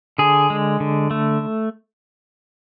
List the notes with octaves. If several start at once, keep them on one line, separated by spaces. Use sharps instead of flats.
D3 G#4
G#3
D3
A3